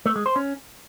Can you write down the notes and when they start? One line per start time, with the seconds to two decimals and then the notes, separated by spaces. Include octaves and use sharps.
0.06 A3
0.16 G#3
0.26 C5
0.36 C#4